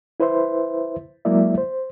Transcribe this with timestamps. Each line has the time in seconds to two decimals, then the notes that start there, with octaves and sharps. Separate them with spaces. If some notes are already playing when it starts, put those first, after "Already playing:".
0.20 E4 B4 C5 E5 C6
1.25 F#3 G#3 A#3 E4 D5 E5
1.58 C5